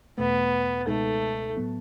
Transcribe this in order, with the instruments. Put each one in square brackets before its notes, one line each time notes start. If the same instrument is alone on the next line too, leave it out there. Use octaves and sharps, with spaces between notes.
[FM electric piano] E2 B2 A3 [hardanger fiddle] B3
[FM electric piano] C#2 B2 G#3 D#4 A4 [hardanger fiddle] A3
[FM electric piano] A2 F#3 B3